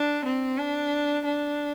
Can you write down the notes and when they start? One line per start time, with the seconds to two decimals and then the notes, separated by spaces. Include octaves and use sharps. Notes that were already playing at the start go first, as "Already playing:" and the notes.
Already playing: D4
0.25 C4
0.58 D4
1.25 D4